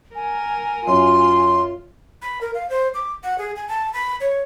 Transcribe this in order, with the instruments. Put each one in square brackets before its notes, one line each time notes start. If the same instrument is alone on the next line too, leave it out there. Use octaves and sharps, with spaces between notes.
[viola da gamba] A#4 [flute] G#5
[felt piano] F#2 [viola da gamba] F4 [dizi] C6
[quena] B5
A#4
F5
C5
D6
F#5
G#4
G#5
A5
B5
C#5